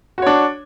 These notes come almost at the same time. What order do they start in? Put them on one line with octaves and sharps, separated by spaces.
F#4 C#5 D4